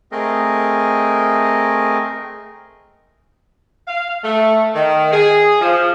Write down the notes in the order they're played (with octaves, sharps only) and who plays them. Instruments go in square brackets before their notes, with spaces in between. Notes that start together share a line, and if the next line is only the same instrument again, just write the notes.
[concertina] A3 C4 G#4 A#4 D#5
[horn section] F5
A3
D#3
G#4
F3